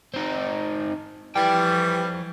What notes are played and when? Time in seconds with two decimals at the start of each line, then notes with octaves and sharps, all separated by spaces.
0.14 C4 D#4
1.36 E3 F3 G3 G5